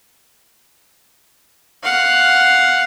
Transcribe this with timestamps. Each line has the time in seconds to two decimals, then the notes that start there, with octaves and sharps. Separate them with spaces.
1.83 F5 F#5